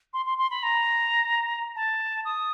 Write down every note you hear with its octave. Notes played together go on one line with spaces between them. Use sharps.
C6
C6
C6
B5
A#5
A5
D#6